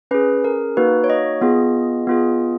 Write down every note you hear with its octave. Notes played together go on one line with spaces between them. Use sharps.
C#4 G#4 B4
A#4
A#3 D#4 F#4 B4
C#5
D#5
B3 F4 G#4
B3 F4 G#4